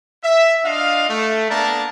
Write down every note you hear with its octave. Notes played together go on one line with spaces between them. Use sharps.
E5
D4 F4 D#5 F5
A3
A#3 B3 D4 A#4 D5 A5